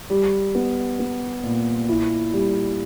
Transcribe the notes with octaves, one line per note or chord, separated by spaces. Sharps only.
G3
B3
B3
A#2
E4
G3